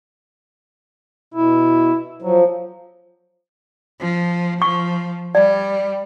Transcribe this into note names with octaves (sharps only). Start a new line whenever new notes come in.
B2 E4
F3 F#3
F3
F3 C#6
G3 D5